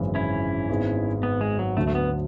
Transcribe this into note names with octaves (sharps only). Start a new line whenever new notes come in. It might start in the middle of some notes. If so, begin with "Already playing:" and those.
Already playing: G#1 F#2 C#3 E3 G#3
C#4 E4
G#1 G#2 G#3 B3
B3
G#3
F#3
D2 D3 F#3 A3
A3
B3